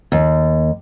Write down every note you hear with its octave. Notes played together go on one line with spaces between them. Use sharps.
D#2